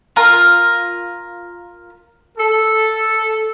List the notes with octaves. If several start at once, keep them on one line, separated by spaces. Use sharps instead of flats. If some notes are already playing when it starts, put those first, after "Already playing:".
F4 A#4
A4